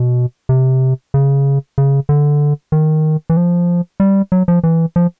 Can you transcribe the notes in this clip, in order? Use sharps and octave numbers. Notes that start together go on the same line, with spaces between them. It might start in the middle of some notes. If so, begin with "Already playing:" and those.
Already playing: B2
C3
C#3
C#3
D3
D#3
E3
F3
G3
F#3
F3
E3
F3